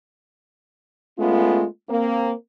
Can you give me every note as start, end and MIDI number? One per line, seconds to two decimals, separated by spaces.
1.19 1.65 56
1.19 1.65 57
1.19 1.65 59
1.19 1.65 61
1.19 1.65 65
1.90 2.33 58
1.90 2.33 60